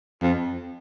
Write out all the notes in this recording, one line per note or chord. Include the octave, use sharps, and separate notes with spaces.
F2